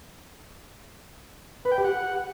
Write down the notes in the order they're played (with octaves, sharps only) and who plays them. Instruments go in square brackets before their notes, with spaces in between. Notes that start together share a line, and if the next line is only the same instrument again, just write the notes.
[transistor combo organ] B4
G5
G4
F#5